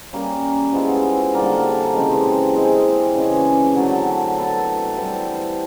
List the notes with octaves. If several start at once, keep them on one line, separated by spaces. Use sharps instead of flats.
G3 A#3 C#4
F3 G#3 B3 E4
D3 G3 A#3 D4
C#3 E3 G#3 C4
G#3 C4 E4
C#3 E3 G#3 C#4
D3 F#3 A3 C4
F#3 B3 E4 A4
E3 G3 C4 E4